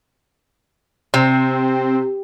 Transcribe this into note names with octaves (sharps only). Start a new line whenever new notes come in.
C3 C4